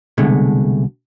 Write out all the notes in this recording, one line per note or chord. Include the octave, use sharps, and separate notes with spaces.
C2 B2 D3 G#3 A3